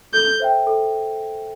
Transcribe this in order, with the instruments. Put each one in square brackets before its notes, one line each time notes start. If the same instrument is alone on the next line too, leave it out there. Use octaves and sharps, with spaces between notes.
[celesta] A4 [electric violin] G6
[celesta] C5 E5 G5
A4